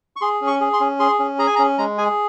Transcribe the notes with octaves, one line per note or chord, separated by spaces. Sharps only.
C#6
G#4 C6
C#4
C#6
G#4
C6
C#4
G#4 C6
C#4
G#4 A#5
G#5
A#5
C#4
G#3 A#5
G#4 G#5